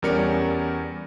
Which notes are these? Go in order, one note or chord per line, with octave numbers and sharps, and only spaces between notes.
E2 G3 C#4 A#4 D5 C#7